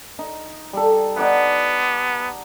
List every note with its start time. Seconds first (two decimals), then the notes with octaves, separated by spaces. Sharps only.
0.19 D#4
0.73 G3 A4
1.17 B3 D#4 D5 F#5